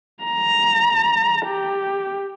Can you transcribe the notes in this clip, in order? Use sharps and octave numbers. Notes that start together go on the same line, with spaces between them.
A#5
G4